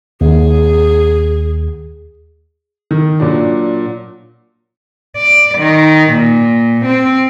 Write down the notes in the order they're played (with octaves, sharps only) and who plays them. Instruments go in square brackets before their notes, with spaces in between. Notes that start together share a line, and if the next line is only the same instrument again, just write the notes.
[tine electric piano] D#2 [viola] G#4
[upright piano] D#3
A#2 F#3 D4
[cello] D5
D#3
A#2
C4